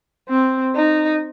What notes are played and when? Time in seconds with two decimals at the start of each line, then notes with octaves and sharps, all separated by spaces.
0.29 C4
0.76 D#4